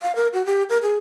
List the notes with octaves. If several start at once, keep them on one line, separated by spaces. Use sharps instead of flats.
F5
A#4
F#4
G4
A#4
G#4